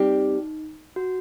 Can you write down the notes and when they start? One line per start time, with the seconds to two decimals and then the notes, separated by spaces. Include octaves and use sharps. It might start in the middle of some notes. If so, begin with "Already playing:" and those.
Already playing: G3 C4 D#4 G4
0.96 F#4